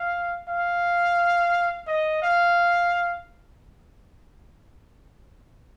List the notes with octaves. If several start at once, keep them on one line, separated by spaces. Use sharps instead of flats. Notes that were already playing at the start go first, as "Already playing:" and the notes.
Already playing: F5
F5
D#5
F5